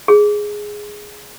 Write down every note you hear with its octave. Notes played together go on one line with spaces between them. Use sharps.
G#4